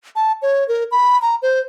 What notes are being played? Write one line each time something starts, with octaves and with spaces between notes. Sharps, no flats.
A5
C#5
A#4
B5
A#5
C5